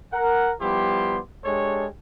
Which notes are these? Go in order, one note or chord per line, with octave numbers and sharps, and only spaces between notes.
A#4 F#5
F3 G3 B3 E4 G4 C6
G#3 D4 G4 A4 C#5